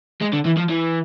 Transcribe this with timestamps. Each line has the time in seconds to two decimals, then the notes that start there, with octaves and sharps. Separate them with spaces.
0.21 G#3
0.33 D3
0.45 E3
0.57 F3
0.69 E3